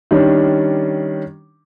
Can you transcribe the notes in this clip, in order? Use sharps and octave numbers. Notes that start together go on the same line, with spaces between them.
D#3 G3 C#4 D4